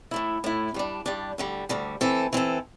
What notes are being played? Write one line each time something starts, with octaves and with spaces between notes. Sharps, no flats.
A2 A3 E4
A2 A3 E4
G2 G3 D4
G2 G3 D4
D2 D3 G3
D2 D3 G3
E3 C4 A4
E3 C4 A4